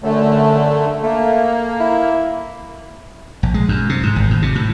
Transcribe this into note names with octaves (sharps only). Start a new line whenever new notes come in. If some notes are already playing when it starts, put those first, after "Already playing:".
F#2 D3 A3
A3 A#3
E4
A#1
G#3
F#2
C3
G#2
G#1
A2
C3
A2